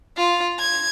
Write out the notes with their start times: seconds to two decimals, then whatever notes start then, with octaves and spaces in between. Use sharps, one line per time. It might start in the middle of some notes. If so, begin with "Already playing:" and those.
0.17 F4
0.60 G#6